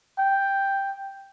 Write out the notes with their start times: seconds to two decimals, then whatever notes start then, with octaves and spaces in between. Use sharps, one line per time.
0.18 G5